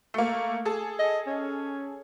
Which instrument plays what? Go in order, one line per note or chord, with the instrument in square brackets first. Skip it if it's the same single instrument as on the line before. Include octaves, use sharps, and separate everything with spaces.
[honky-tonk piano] A3 A#3
G#4 A4
[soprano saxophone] D#5
C#4